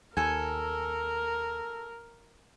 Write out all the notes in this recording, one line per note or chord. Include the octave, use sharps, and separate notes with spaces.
D#2 A4 A#4 G#5